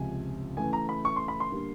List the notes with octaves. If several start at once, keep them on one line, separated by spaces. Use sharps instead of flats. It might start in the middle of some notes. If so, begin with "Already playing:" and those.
Already playing: C#2 C3 F3 G#5
C#3 E3 A3 G#5
A#5
B5
C#6
C6
B5
C6
D3 G3 A#3